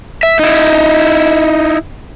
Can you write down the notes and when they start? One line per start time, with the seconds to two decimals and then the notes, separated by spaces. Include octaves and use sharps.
0.23 E5
0.39 D#4 E4